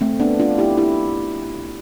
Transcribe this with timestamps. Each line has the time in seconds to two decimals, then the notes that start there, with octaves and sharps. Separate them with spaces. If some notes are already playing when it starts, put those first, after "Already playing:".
0.01 A3 C4
0.20 B3 D4
0.40 D4 F4
0.58 E4 G4
0.77 E4 G4